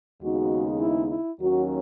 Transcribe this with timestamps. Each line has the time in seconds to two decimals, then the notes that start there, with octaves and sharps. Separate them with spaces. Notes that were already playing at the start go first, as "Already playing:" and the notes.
0.22 D#2 C#3 G#3 B3 D#4 F#4
0.80 E4
1.10 E4
1.40 D#2 D#3 F#3 C#4 F#4